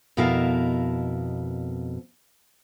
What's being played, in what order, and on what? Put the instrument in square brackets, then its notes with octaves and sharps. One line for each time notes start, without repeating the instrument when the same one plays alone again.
[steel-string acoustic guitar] F2 B2 E4 A#4 F5 A5